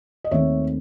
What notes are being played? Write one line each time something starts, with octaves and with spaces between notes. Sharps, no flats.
D#5
D#2 D#3 A3 C4 C#5 E5